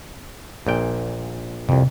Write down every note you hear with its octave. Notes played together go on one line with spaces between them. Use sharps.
A#1 A#2 G5
C2 F2 C3